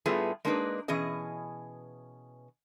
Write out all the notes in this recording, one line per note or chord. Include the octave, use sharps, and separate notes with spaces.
A2 G3 A3 B3 F4 G#4
G#3 A#3 D4 D#4 G#4 B4
B2 E3 C#4 G#4 D#5